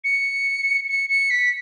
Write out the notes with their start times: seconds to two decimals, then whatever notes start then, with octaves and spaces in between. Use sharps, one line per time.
0.04 C#7
0.89 C#7
1.10 C#7
1.30 B6